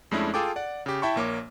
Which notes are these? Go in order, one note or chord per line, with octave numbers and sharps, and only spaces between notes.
F2 G#3 A3 C#4 D4 E4
F4 G#4 A4 G5 A5 D6
D5 F#5
C#3 G4
E4 E5 G5 A5 B5 C#6
A#1 A#3 C#5 D6